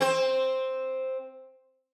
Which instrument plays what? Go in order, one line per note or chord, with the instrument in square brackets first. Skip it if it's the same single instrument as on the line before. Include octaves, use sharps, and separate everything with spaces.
[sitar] C4 C5